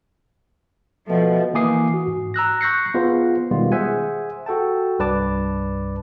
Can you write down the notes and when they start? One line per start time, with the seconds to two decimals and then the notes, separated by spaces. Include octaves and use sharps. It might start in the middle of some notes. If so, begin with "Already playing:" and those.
1.08 B2 F3 A3
1.54 E3 A#3 G#5 D6 D#6 C7
1.94 F#4
2.07 G#2
2.34 A#5 E6 F#6 A#6
2.61 C#6 F#6 G6 A#6 C7 C#7
2.94 B3 F4 G#4 B4 C5
3.51 B2 D#3 G3 G#3 B3 F4
3.72 G#4 C5 E5 F#5 G#5
4.46 F#4 A4 G5 A5
4.99 C2 G2 B4 D5 A5 D6